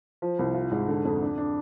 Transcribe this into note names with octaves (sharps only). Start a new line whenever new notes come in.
F3
C2
F4
G#2
D3
F2
D4
D4